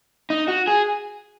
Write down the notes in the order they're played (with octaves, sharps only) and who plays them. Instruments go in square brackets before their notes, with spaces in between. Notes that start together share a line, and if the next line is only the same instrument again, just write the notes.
[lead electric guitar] D#4
F#4
G#4